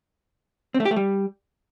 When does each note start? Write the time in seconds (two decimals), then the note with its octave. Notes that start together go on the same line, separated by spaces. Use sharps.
0.74 C4
0.80 A3
0.85 G4
0.91 A3
0.96 G3